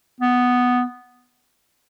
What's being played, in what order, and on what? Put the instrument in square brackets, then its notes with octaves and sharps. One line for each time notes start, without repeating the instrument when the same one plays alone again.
[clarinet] B3